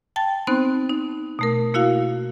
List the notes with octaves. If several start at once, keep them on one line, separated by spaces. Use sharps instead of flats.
G5 A5 A6
B3 C4 D#4 C5 C6 F#6
D#4
B2 A3 A#4
A#3 E4 F#4 F5